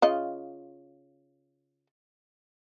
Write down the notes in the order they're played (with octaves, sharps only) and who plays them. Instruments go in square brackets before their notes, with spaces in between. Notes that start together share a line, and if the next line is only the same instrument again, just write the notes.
[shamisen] C#3 F4 D#5